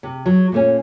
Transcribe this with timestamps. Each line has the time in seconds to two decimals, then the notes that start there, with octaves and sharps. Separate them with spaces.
0.03 C3
0.26 F#3
0.52 A#2 A3 C#4